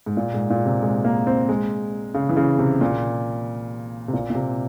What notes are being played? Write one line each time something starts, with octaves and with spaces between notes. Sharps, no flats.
G#2
A#2
G#2
A#2
C3
G#3
A#3
C4
G#3
C#3
E3
C#3
C3
A#2
C3
A#2
A#2
C3